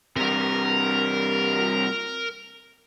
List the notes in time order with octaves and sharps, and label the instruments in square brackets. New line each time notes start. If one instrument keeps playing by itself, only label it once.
[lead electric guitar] G2 C3 [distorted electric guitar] A#4